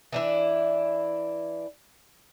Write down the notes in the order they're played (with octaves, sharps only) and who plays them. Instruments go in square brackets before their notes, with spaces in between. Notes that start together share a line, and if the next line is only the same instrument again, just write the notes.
[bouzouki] E3 D4 E4